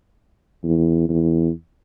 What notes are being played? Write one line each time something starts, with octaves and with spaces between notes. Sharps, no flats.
E2
E2